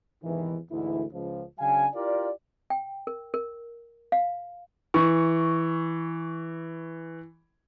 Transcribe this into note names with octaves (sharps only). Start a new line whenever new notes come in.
E2 G#2 C3 D#3 E3
D2 G#2 E3 E4
C#2 F3
C#3 F#3 D4 F5 G#5
E4 F4 G4 A#4 D5
G5
A#4
A#4
F5
E3 C#6